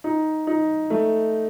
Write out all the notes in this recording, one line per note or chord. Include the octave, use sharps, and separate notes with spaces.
D#4
D#4
A3